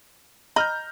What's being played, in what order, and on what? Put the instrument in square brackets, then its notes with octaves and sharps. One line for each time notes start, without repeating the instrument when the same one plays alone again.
[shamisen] D#5 B5 [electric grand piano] A#5 F6 G6